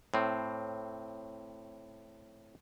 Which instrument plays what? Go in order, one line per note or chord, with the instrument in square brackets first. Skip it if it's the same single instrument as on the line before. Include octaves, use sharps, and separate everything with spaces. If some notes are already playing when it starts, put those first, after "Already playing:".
[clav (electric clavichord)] A2 C4